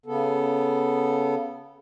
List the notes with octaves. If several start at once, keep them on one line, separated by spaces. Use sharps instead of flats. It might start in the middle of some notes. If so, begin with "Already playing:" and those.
C#3 B3 A4